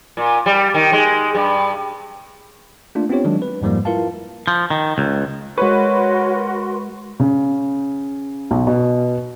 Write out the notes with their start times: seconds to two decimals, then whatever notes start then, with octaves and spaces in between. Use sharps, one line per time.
0.17 A#2
0.46 G3
0.74 D#3
0.92 G#3
1.35 G2
2.95 A3 A#3 D4 F4
3.09 B3 C4 D4 F4 G4 C#5
3.25 D#3 F#3 G#3 D4
3.42 B4
3.62 F2 G#2 F3 G3 A#3
3.85 E4 F4 A#4 B4 F5 A5
4.48 F3
4.70 D#3
4.98 C#2
5.58 G#3 F#4 A#4 B4 C#5 C6 C#6
7.20 C#3
8.51 B1
8.67 B2